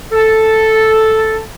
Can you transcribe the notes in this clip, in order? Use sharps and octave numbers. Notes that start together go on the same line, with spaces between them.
A4